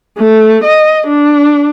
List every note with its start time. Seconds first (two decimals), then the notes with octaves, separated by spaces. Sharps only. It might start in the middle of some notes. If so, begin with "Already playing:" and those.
0.18 A3
0.64 D#5
1.07 D4